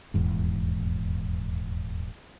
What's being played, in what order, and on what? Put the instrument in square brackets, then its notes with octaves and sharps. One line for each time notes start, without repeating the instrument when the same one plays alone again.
[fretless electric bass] D#1 E2 G#2